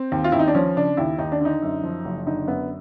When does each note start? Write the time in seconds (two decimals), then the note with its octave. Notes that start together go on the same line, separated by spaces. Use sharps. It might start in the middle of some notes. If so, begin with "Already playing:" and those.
Already playing: C4
0.12 D#2
0.24 F4
0.32 D#2 E4
0.39 D#4
0.48 D4
0.54 F3 C#4
0.76 C#3 D4
0.97 D#2 E4
1.19 D#2 D#4
1.32 D4
1.40 D3
1.45 D#4
1.62 F#2
1.83 F3
2.05 F#1
2.27 D3 D#4
2.47 F#2 B3